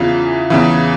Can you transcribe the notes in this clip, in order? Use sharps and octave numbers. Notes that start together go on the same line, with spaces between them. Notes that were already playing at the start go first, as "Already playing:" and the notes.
Already playing: E2 C#3 E3 F4
E2 C#3 E3